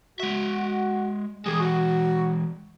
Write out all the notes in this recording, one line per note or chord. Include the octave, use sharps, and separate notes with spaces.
G#3 F#4 E5
E3 G#3 G4 G#4
F#4